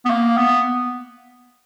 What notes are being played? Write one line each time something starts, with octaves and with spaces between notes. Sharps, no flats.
B3
A#3
B3